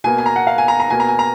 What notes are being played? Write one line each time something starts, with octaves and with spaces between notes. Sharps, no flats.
B2 A#3 G#5
G#5
A#5
F#5
F5
G#5
A#5
A#5
B2 A#3 G#5
A#5
G#5
A#5